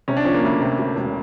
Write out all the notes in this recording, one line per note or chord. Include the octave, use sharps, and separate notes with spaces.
C3 C#4
D4
F3 C#4
A#3
D2
C3
D2
E1